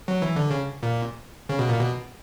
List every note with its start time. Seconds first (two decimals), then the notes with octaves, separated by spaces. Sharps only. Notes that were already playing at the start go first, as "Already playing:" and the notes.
0.08 F#3
0.22 E3
0.36 D3
0.50 C#3
0.83 A#2
1.49 C#3
1.59 B2
1.69 A#2
1.79 B2